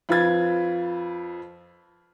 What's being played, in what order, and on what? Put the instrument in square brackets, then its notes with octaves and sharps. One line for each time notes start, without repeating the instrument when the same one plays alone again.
[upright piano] F2 F4 B4 B5 G#6 A6